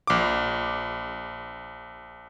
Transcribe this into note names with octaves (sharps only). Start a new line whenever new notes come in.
A#1 D6